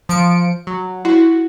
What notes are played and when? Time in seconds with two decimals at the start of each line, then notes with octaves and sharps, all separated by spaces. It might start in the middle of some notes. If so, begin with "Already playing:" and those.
0.09 F3 C#7 D7
0.67 F#3
1.05 E4 F#4